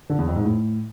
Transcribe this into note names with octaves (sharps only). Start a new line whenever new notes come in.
D3
E2
F2
G#2
A2